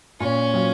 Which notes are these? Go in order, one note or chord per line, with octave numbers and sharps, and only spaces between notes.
A#2 C#4
F#3 C4 F4